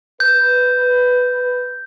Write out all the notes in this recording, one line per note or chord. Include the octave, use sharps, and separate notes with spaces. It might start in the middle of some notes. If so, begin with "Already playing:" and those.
B4 G6